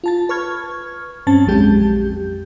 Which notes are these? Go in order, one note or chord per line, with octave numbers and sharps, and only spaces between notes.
F4 A5 A6
B4 C#6 F6 G#6
G2 C4 C#4 A5 A6
A#1 F2 F#3 G#3 G4 G6